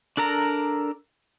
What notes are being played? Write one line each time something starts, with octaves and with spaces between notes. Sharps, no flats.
D4 A4 A#4 A#5